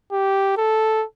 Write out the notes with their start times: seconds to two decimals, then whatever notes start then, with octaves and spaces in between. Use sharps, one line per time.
0.12 G4
0.57 A4